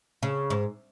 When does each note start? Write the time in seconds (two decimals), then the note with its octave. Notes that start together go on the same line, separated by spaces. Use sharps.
0.23 C#3
0.50 G#2